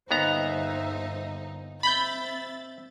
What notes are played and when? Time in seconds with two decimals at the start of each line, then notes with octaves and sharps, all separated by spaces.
0.11 G1 D#2 B3 D#4 C5 E5 A#5
1.83 C4 E5 B5 G6 A6